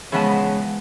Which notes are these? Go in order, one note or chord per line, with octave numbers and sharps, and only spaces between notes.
C#3 E3 F3 G#3 B3 A5